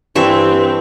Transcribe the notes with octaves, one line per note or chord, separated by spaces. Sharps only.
G2 E3 C4 E5 C#6